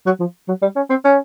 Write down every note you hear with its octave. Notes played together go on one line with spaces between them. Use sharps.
F#3
F3
F#3
G3
C#4
C4
C#4